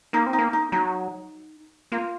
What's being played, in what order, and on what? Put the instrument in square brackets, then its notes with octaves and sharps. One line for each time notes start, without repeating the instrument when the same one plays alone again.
[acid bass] A#3 [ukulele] D#4
[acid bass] C4
[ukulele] D#4
[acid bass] A#3
[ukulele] D#4
[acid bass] F#3 [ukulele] D#4
[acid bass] A#3 [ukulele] F4